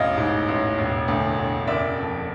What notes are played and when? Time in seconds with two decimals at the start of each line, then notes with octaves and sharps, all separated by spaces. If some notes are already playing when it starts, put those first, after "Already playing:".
Already playing: E1 A1 D#5 F5
0.17 G#2
0.48 A1
0.78 E1
1.08 D2
1.38 E1
1.67 F#1 D5 E5
1.98 F2